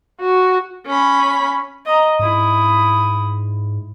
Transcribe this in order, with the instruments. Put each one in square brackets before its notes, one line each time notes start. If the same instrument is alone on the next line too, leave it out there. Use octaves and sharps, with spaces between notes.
[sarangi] F#4
[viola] C#4 B5
[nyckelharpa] D#5 A#5
[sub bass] G#2 [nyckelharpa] E4 D#6